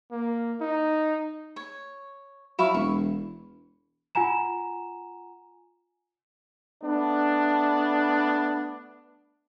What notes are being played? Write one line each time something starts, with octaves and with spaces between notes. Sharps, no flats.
A#3
D#4
C#5
F#3 E4 F5 C#6
E1 C#6
F4 F#5 G#5 A#5 E7
A3 B3 D4